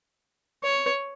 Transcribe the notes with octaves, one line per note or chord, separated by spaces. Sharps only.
C#5